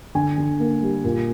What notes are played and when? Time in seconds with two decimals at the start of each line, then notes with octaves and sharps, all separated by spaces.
0.15 D3 G#5
0.38 D3
0.60 A#3
0.82 G3
1.04 A#2